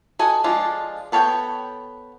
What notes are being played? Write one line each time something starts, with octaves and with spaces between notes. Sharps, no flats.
F#4 A4 D#5 G#5
F3 G#3 D4 F4 A4
B3 A4 C#5 F5 G5